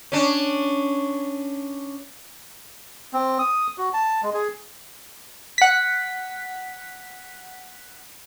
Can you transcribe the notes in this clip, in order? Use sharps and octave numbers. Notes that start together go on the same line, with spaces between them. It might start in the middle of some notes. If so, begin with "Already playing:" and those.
C#4 D4
C4
D#6
F#4
A5
G#3
G#4
F#5 B6